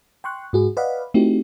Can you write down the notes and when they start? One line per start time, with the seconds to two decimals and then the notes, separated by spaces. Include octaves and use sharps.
0.24 G5 C6 C#6 F#6
0.53 G#2 F#4 G#4
0.77 B4 D5 D#5 F5 F#5 B5
1.14 A3 C4 D#4 E4 F#4 G4